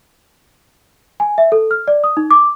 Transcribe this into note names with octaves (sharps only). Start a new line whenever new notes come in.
G#5
E5
A4
F6
D5
D#6
D#4
D6